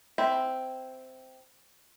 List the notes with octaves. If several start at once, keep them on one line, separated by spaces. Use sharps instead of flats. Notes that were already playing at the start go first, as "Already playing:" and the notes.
C4 E4